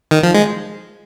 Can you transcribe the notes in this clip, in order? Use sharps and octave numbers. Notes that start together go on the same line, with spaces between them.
D#3
F3
G#3